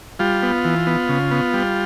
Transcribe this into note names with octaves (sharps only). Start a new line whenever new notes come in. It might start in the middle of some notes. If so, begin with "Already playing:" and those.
G3 F4
B3
E3
B3
C#3
B3
G3